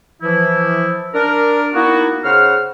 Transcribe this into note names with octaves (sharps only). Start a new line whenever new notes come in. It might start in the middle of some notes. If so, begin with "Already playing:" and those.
E3 F3 E4
D4 A#4
A#3 B3 D#4 E4 F#4
C#3 C5 F#5 F6